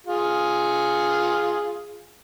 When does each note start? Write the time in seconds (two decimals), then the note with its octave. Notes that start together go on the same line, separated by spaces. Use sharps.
0.07 F4 G#4